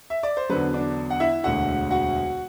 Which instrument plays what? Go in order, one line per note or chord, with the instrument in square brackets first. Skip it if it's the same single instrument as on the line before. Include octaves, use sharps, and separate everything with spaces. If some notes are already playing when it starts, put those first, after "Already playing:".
[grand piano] E5
D5
C5
E2 D3 F#3 B4
D4 D5
F#5
E4 E5
E1 D2 D3 F#4 F#5
F#4 F#5